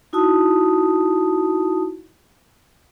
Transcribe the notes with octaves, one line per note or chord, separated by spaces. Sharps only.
D#4 E4 F#4 A5 D#6